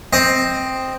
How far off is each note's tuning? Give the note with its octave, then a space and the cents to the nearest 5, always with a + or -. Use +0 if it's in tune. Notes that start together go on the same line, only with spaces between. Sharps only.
C4 +0 D#5 +0